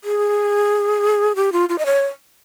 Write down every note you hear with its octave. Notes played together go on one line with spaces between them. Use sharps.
G#4
G4
F4
F4
D#5
C#5